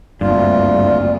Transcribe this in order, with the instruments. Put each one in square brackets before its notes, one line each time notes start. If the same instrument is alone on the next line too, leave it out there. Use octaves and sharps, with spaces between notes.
[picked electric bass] F#1 A#3 C4 [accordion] D2 F4 [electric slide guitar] G2 [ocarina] D5